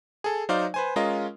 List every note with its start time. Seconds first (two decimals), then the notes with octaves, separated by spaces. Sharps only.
0.24 G#4 A4
0.49 F#3 D#4 C5 D5 F5
0.74 B4 C5 G#5
0.96 G#3 C#4 F4 A#4 D#5